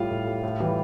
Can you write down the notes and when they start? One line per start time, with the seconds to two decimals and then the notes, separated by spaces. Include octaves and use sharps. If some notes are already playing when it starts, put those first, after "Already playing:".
Already playing: A2 G3 F4 F5
0.11 A2
0.27 G3
0.44 A2
0.60 E3 G3